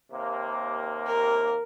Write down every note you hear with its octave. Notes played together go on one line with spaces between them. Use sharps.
D#2 C3 A#3
A#4